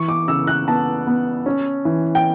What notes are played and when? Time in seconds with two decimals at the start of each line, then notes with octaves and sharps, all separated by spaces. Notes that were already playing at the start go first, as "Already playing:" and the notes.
Already playing: E3 C#6
0.09 D6
0.28 C#3 E6
0.47 F#6
0.67 B3 A5
1.07 B3
1.46 C#4
1.85 E3
2.15 G5